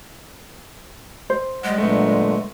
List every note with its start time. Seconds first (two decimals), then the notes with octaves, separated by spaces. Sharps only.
1.30 C5
1.64 G3 G#3 D#5 F#5
1.78 A#2 D3 F#3 A3 B3